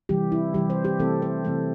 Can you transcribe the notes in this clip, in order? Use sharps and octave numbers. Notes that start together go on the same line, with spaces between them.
C3 E3 G3 G4
E4
C3 E3 G3 G4
C5
G4
C3 E3 A3 C4 A4
C5
C3 E3 A3 C4 A4